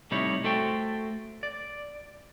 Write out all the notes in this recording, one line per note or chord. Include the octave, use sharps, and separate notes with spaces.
A2 C3 G3 D#4 E4 C#5
A3 F#4 A4 C5 G5
D5